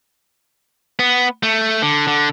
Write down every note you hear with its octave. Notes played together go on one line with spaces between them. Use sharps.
B3
A3
D3
D3